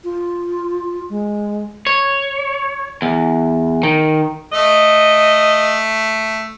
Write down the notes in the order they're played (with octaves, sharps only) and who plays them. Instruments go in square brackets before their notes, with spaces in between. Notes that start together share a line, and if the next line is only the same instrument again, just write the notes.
[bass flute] F4
G#3
[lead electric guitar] C#5
E2
D#3
[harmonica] A3 [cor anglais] D#5